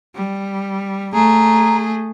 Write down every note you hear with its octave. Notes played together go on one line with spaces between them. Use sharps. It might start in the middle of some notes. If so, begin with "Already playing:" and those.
G3
A3 G#4 A#5